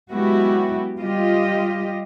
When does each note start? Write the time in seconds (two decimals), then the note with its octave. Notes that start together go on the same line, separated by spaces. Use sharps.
0.12 F#3 G#3 B3 E4 F#4 G4
1.00 G3 F4 G4 D#5